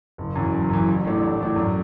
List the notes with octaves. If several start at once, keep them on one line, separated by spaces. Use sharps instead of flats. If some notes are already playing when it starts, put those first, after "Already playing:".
F#1
F#2 E3
F#1
F#2 E3
A1
A2 A3 D4
A1
A2 A3 D4
F#2